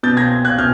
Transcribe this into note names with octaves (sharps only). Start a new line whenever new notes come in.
B2 G6 A6
G#6 A#6
F#6 G#6
B2 F6 G6